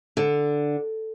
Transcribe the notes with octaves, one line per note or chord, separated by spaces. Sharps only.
D3